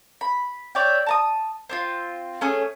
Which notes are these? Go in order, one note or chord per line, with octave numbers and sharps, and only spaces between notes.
B5
C#5 D5 E5 G5
A5 A#5 D#6
C4 D4 F4
A3 C#4 G#4